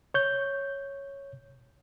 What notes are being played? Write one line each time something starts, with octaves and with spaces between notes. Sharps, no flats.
C#5 G6